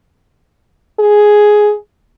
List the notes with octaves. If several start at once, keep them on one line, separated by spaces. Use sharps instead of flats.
G#4